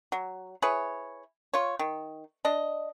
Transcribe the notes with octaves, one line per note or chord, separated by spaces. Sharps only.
F#3
E4 G#4 B4 C#5
F4 C#5
D#3
D4 D#5